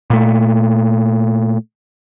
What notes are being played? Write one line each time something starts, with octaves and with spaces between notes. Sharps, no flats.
A#2 A3